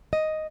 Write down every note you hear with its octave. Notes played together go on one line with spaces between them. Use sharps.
D#5